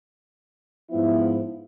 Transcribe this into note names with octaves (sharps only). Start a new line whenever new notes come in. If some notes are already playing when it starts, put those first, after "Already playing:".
G#2 F3 B3 E4